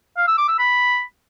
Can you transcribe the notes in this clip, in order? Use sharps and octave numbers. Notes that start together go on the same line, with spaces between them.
F5
E6
D6
E6
B5